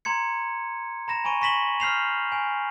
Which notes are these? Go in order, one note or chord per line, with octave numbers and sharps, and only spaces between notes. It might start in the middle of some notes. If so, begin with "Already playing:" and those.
A#5 C6 G#6 C#7
A#5 B5 A#6 E7
G#5 B5 C#6 D#7
C#6 A#6 B6 E7 F#7 G7
F6 G6 C7 F7
G#5